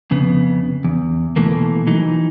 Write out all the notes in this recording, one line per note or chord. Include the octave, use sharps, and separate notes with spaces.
F2 C#3 B3
E2
B2 E3 A3 A#3
E3 F#3 D#4